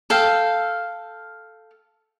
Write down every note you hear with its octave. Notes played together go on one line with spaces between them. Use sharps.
A4 F5 G5